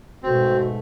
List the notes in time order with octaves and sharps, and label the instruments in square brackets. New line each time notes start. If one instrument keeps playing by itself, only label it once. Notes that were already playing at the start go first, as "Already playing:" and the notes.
[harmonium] G#2 A3 [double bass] B2 [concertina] C4 [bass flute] F#4